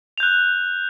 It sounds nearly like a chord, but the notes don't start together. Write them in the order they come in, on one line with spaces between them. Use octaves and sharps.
F7 G6 F#6